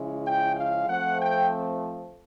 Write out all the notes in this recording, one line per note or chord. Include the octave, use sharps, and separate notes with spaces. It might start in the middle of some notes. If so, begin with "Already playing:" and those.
Already playing: C#3 F3 G#3 C#4 E4
G5
F5
F3 A3 C4 F#5
G5